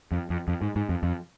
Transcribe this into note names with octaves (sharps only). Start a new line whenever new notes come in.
F2
F2
F2
G#2
G#2
F2
F2